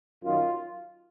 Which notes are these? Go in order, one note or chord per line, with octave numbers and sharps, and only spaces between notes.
F#2 D#3 F#3 F4